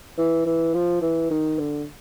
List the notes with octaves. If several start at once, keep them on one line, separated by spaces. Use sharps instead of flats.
E3
E3
F3
E3
D#3
D3